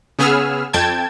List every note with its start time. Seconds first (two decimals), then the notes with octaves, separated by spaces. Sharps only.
0.19 C#3 B3 G#4 E6 F6
0.73 F2 G5 A5 G#6